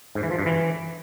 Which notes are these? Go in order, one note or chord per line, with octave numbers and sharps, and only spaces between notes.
G#2
E3
F3
G2
E3